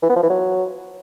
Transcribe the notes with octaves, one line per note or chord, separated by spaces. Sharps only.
E3
B3
F3
E3
F#3